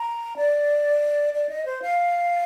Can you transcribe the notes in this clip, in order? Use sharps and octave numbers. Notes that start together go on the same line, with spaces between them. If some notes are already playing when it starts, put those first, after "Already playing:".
Already playing: A#5
D5
D5
D#5
C5
F5